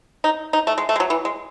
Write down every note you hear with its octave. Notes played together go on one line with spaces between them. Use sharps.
D#4
D#4
A3
G#3
A3
G#3
F#3
E3
G#3